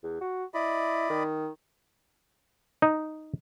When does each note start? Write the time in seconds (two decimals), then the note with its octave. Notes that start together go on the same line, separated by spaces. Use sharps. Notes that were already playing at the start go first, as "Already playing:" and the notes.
0.03 E2
0.21 F#4
0.54 E4 D5 D#5 B5
1.10 D#3
2.82 D#4